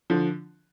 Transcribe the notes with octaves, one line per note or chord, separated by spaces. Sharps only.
D3 F3